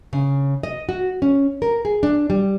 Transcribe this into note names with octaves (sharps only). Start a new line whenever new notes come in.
C#3
D#5
F#4
C#4
A#4
G#4
D4
G3